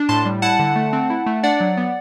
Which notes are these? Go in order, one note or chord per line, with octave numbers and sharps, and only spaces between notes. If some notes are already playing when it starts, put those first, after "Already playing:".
Already playing: D4
A2 A5 C6
G3
E4 F#5 A5
D3
A3
C4
E4
A3
D4 D5 F#5
F#3
B3